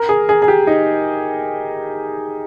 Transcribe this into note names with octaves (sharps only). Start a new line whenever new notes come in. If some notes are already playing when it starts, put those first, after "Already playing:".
Already playing: A#4
G#4
G#4
G#4
G4
D#4